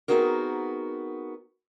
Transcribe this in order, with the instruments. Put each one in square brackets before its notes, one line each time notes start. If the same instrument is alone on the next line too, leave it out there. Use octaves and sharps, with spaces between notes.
[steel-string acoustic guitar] B3 C4 D#4 F#4 G#4 A#4